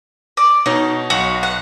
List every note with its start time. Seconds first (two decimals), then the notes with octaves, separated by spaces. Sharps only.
0.37 D5
0.66 B2 D#4 C#5
1.10 B1 F#4
1.43 F#5